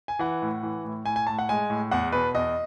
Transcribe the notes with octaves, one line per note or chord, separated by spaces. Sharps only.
G#5
E3 F#5
A2
E3
A2
A2 G#5
G#5
A2 A5
F#5
G#3 G#5
A2
E2 F#5
B2 B4
E2 D#5